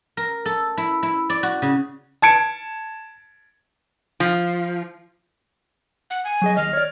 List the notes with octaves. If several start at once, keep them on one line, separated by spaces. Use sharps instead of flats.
A#4
A4
E4
E4
D5
F#4
C#3
A5 G#6 C#7 D7
F3
F#5
G#5
F#3 G#4 D#5
D#2 D#5 F6
C#5 D5